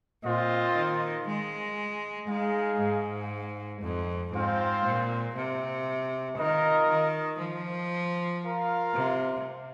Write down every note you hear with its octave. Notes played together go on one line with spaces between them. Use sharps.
A#2 C4 F4 C5 D#5
D#3
G#3
G#3 D#4 G#4 F5
G#2
F2
G#2 C4 F4 C5 F5
A#2
C3
D#3 F4 A#4 D#5
D#3
F3
F4 A#4 F5
C3